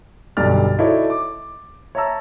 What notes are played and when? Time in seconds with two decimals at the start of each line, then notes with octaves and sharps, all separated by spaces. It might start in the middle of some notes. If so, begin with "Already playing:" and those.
0.37 B1 G2 D3 D5 F6 A6
0.78 D#4 E4 F#4 A4 C#5 D5
1.10 D6
1.95 C#5 E5 A5 A#5 E6